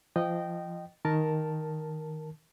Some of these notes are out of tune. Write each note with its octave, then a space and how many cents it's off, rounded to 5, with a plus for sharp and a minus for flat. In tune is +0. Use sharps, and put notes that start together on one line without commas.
F3 -25 D#5 -15 G5 -15
D#3 +5 A#4 +0 A5 +0